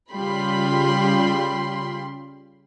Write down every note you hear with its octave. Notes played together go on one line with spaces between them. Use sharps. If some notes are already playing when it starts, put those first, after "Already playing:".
C#3 G3 F4 G5 B5 C6